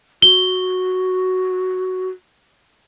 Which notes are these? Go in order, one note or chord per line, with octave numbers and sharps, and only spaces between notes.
F#4 G7